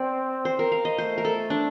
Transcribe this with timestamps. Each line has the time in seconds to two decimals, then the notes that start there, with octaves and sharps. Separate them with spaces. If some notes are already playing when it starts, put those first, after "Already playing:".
Already playing: C4 C5 D5
0.45 C5
0.59 A#4
0.72 F5
0.85 D#5
0.98 A3 C5
1.18 A#4
1.25 A4
1.50 D4